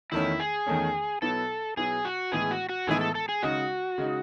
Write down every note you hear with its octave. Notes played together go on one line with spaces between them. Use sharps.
E2 D#3 A3 C#4 E4
G#4
E2 D#3 A3 C#4
B2 F#3 B3 E4 A4
B2 F#3 B3 E4 G#4
F#4
A2 E3 G#3 B3 E4 G#4
F#4
F#4
A2 E3 G#3 B3 E4 G#4
A4
A4
G#4
C#3 G#3 D#4 F#4
C#3 G#3 D#4